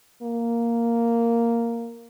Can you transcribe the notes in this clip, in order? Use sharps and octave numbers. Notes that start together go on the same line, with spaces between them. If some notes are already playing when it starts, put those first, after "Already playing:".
A#3